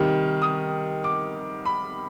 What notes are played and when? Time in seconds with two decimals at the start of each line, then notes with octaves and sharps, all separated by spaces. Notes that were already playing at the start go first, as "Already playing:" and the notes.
Already playing: C3 D#3 G3 F6
0.42 D#6
1.04 D6
1.65 B5